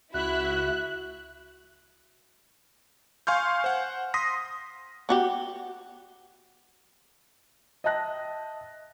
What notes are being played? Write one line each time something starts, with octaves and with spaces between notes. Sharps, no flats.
C#2 E4 F#4 E5 F#6
F5 G#5 C6 C#6 F6 G6
C5 F#5
C6 D#6 A#6 B6
B3 F#4 G4
D#5 E5 G5 A5 F#6 A#6